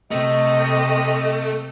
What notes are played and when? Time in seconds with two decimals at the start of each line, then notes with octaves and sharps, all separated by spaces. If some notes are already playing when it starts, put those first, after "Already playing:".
0.11 C3 A3 D#5